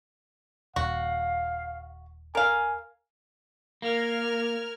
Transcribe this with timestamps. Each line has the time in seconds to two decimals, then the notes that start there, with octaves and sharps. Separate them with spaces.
0.76 D#1 F#4 F5
2.35 A#4 F5 G#5
3.82 A#3 A#4 F6 G#6